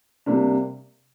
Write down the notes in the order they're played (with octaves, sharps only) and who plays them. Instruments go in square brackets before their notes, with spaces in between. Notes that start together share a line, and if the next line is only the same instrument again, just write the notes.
[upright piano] C3 G3 A#3 D4